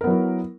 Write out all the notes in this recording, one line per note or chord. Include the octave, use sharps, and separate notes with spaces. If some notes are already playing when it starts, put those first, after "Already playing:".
F#3 B3 E4 A#4